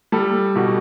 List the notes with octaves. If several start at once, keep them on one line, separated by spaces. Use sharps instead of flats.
G3 A4
B2 F#4